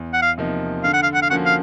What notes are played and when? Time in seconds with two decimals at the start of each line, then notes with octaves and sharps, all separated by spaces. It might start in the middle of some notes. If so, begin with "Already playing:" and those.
Already playing: E2
0.13 F#5
0.22 F5
0.38 C3 F3 A#3 D#4
0.83 D3 F5
0.93 F#5
1.03 F5
1.14 F#5
1.22 F5
1.30 F3 A#3 C#4 F#4 F#5
1.45 F5